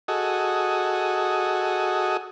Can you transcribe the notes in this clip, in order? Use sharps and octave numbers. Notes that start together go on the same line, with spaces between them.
F#4 G#4 A4 D#5